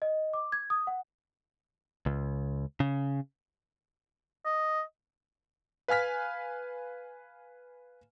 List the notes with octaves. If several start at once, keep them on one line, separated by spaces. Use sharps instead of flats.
D#5
D6
G#6
D#6
F#5
C#2
C#3
D#5
B4 F5 G#5 F6 B6